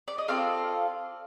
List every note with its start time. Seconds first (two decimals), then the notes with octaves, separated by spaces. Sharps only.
0.08 D5
0.18 D#5
0.28 C4 F4 A4 D5 F5